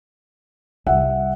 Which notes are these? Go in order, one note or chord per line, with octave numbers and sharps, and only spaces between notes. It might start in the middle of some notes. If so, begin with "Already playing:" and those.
C2 G3 E5 F#5